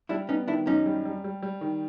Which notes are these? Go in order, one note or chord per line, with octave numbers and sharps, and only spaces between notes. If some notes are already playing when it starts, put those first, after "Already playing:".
G3 D4 E4
B3 C#4 D#4
D#3 D4 E4
F#2 C#4 D#4
G3
G3
G3
G3
D#3